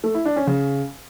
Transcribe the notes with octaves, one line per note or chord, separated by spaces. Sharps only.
A3
E4
D4
C#4
C#3